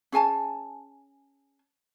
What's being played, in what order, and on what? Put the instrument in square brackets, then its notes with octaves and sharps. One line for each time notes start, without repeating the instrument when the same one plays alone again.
[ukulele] C#4 G#4 G#5 A5